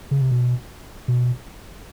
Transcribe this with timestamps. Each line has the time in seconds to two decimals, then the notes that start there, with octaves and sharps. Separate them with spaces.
0.11 C#3
0.21 C3
0.31 B2
1.08 B2